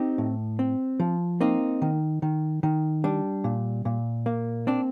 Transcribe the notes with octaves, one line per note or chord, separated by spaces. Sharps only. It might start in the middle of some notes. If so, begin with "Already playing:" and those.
Already playing: C4 D#4 G4
A2
C4
F3
A#3 C4 D#4
D#3
D#3
D#3
G3 D4
A#2
A#2
A#3
C4 D4